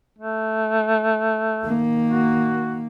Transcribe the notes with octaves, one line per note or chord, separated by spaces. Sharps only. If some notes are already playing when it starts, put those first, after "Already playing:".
A3
D#3 A#3
F#4